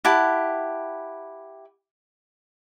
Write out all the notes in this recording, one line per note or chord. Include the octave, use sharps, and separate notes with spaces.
E4 G4 F#5 A5